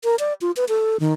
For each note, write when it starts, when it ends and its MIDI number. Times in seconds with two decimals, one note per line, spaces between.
0.04 0.16 70
0.19 0.33 74
0.41 0.51 65
0.57 0.65 71
0.69 0.97 69
1.00 1.13 51